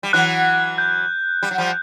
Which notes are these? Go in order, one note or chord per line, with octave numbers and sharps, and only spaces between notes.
G3
E3 F#3 F#6
G6
G3
F#3
F3 G3